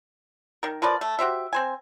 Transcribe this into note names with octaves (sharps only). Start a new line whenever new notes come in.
D#3 A#4
F3 A#4 B4 D5
A3
F#4 G4 C5 E5
C4 C5 G#5